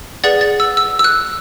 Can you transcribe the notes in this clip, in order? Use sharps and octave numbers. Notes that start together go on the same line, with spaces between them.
G#4 B4 D5 F#5 A6
A6
E6
E6
E6
F#6